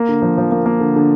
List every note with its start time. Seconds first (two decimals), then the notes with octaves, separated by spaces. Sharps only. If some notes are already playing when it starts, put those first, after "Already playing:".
Already playing: A#3
0.09 D3
0.22 F3
0.38 F3
0.51 A#3
0.66 A#3
0.80 D3
0.96 D3